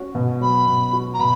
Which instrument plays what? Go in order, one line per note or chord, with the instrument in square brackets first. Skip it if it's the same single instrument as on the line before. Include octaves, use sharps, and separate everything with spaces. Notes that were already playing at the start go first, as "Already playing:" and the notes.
Already playing: [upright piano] C#4 F#4
B2
[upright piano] F#3 [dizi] B5
[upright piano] B2
F#4
[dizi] A#5
[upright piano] B2 [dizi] B5